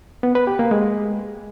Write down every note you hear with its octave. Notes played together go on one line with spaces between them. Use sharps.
B3
B4
G4
A#3
G#3